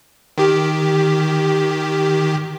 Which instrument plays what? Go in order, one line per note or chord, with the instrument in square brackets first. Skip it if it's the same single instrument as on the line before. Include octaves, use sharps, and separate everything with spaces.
[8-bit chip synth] D#3 G4